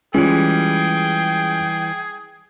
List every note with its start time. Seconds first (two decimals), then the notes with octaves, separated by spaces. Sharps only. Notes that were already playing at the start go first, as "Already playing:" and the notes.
0.14 E3 G3 G#3 C#4 F4 G#4 G5